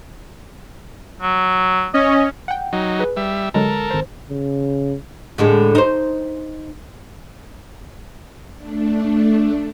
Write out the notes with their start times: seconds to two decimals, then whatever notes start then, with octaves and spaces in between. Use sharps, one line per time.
1.21 F#3
1.94 C#4 D#5
2.48 F#5 G5
2.73 F#3 D#4
2.99 G#4 B4
3.17 G3 E5
3.54 D3 F#3 G#3 A4 A#4
3.91 G#1 C5
4.30 C#3
5.38 A2 D3 G#3
5.75 D#4 C5
8.56 A3 D4